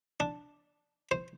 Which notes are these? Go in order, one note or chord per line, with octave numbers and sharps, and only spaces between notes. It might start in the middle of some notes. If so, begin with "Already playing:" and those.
D4
C5